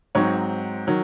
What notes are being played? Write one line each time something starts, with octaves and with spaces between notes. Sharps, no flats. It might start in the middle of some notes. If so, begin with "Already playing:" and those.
G#2 F#3 C4 D#4 C#5
D#3 F#3